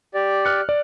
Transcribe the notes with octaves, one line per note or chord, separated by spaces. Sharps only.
G4 D5
F6 F#6 C#7
D5